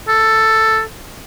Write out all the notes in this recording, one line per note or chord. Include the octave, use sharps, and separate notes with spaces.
A4